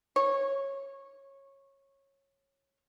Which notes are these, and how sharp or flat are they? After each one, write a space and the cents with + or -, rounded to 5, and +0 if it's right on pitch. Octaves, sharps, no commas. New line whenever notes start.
C#5 -15